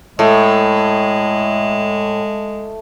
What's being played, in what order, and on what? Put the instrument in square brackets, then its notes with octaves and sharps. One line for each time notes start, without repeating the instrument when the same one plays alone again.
[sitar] A2 [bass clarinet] G#3 [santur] A3